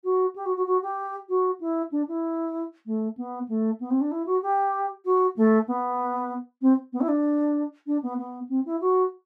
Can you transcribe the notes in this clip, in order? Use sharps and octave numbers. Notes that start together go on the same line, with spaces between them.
F#4
G4
F#4
F#4
F#4
G4
F#4
E4
D4
E4
A3
B3
A3
B3
C4
D4
E4
F#4
G4
F#4
A3
B3
C4
B3
E4
D4
D4
B3
B3
C4
E4
F#4